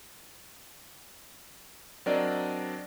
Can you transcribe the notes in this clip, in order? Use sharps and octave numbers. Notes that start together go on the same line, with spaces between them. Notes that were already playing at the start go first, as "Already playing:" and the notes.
F#3 C4 D4 A#4 D5 D#5